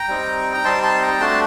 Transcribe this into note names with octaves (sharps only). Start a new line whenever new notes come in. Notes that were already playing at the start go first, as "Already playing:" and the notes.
Already playing: G5 A#5
G3 C4 D#4
A#5
G3 C4 D#4 A5 C6
A5 C6
G5 A#5
A3 D4 F#4 A5 C6